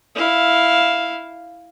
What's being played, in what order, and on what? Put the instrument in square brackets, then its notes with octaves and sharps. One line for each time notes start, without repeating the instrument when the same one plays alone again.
[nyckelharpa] E4 F5